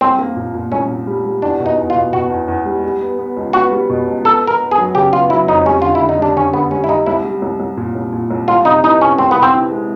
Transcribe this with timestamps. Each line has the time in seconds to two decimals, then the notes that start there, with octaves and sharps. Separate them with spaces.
0.01 C2 C4
0.19 A#3
0.36 A#2
0.54 A#2
0.72 C2 C#4
0.90 A#2
1.07 G3
1.25 G3
1.42 E2 D4
1.60 B2
1.66 D#4
1.78 E2
1.90 F4
1.95 B2
2.13 B2 F#4
2.30 E2
2.48 E2
2.65 G3
2.83 G3
3.01 B3
3.19 B3
3.37 C#2
3.53 B3 F#4
3.72 G3
3.90 B2
4.07 C#2
4.25 B3 A4
4.42 B3
4.47 A#4
4.60 B3
4.71 G#4
4.78 F#3
4.95 C#3 G4
5.13 B3 F4
5.30 F#3 E4
5.48 F2 D#4
5.65 G3 C#4
5.82 D3 F4
5.95 E4
6.01 D3
6.09 D#4
6.19 G3 D4
6.37 D3 C#4
6.53 D3 B3
6.71 G3 C#4
6.84 E4
6.89 G3 D#4
7.06 C2 E4
7.24 G3
7.42 C2
7.59 C2
7.77 A#2
7.95 C2
8.13 A#2
8.30 C2
8.48 C2 F4
8.65 C3 D#4
8.84 E3 D#4
9.01 C3 C#4
9.18 C2 C4
9.31 B3
9.36 C3
9.42 C4
9.54 E3
9.72 G#3